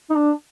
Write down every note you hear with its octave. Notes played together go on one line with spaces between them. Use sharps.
D#4
D4